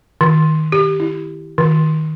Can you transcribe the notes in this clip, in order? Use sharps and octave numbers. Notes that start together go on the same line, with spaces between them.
D#3
G4
E4
D#3